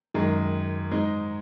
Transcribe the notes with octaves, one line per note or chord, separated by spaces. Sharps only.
F#2 D#3 G#3
G#2 G#3 D#4